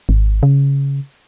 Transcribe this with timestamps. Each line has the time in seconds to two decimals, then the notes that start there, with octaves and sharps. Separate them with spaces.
0.09 G#1
0.43 C#3